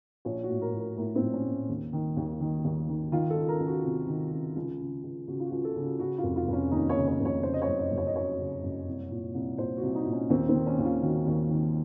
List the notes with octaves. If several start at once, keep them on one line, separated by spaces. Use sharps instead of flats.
A#1 C#5
F#4
A2
A#4
A#1
A#4
A2 A#4
C4
A#1
C#4
A2
D#2
D#3
D#2
D#3
D#2
D#3
D#3 F4
A4
C#2
A#4
C#2
F#4
C3
D#3
C#2
C#2
C#3
C#2
C#3 F#4
F4
F#4
C#2
A4
C#3
F#4
C#3 F#4
F4
F1
F4
F1
C#4
D#2 D#4
C#5
C#3
C#5
F1
C#5
C#3 C5
D#5
C#5
F#1
D#5
F#1
C#5
D#5
F#2 C#5
C#3
F#1
C2
A#2
C2
A#2 C5
F#4
C2
D#4
A#2
C#4
D#2 C4
C4
D#3
C#4
D#2
F4
D#3 F#4
D#2
D#3